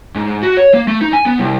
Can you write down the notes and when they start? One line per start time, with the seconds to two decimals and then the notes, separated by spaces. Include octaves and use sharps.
0.16 G#2
0.43 F#4
0.57 C#5
0.74 A#3
0.87 A3
1.02 D#4
1.13 G#5
1.26 B3
1.38 C2